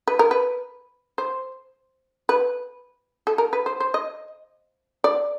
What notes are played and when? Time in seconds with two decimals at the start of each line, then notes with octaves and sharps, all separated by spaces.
0.08 B4
0.19 A#4
0.31 B4
1.18 C5
2.29 B4
3.27 A4
3.38 A#4
3.53 B4
3.66 C5
3.80 C5
3.94 D#5
5.04 D5